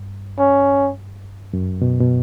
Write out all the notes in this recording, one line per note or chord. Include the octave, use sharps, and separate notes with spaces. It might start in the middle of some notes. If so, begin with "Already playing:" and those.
Already playing: G2
C#4
F#2
B2
B2